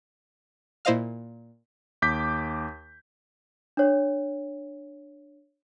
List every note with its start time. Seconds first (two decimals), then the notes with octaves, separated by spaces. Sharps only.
0.85 A#2 E4 C5 D#5 F5 F6
2.02 D#2 D6 G6 B6
3.77 D4 C#5